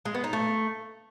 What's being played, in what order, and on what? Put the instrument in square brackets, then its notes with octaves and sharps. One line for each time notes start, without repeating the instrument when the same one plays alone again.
[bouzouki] G#3
B3
D#4
A3